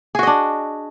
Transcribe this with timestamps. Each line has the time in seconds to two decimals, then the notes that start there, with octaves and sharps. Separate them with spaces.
0.15 G#4
0.19 F#4
0.23 D#5
0.27 D4